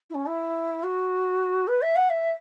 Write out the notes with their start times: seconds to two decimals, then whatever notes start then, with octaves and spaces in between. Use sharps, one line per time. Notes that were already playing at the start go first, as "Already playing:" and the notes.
0.10 E4
0.14 C#4
0.28 E4
0.83 F#4
1.67 B4
1.82 E5
1.96 F#5
2.10 E5